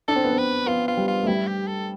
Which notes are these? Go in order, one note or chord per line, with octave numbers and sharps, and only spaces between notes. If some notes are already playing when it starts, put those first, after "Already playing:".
D4 A4
C4
B3
C4
B4
B3 F4
F4
G3
F4
A3
G3 E4
G4
A4